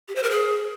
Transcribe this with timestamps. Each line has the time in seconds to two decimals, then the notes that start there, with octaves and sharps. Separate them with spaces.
0.08 G4
0.16 C5
0.23 A#4
0.31 G#4